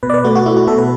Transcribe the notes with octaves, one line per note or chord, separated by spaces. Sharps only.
B2 B4
D5
B4
A3 F#4
F#4
A3 E4
F#4
B2 A4
B4